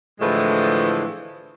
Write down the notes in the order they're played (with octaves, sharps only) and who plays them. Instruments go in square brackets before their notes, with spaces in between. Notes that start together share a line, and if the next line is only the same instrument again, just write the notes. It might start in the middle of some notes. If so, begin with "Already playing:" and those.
[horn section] A2 D3 E3 F3 G#3 A3